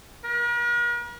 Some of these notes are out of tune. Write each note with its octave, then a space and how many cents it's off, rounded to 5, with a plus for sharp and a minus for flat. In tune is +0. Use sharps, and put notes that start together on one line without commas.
A#4 +45